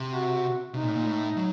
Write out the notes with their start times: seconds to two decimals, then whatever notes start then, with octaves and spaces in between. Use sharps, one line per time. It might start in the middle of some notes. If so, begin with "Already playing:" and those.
Already playing: C3
0.12 F#4
0.74 C3 D#4
0.82 A#2
0.89 A2
0.96 A#2
1.06 A2
1.37 F#3